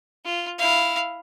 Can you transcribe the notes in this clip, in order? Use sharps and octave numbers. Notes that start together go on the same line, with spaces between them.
F4
E4 F5